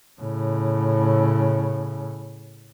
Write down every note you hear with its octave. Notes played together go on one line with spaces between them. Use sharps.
A2 C#3